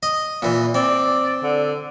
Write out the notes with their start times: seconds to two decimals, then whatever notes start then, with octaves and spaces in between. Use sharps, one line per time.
0.03 D#5
0.42 A#2 E3
0.74 C4 D5
1.43 D3